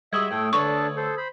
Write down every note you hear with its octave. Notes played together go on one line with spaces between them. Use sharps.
G3 G#3 F#4 E5 D#6 E6 G#6
A2 A3 G5
D2 D4 A4 B4 C#5 A5 C#6
A4 C5
C5 B5